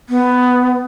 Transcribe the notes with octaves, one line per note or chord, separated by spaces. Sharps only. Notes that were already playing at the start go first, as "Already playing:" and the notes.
B3